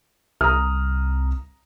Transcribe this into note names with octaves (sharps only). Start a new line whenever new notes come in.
C2 A#5 D#6 F6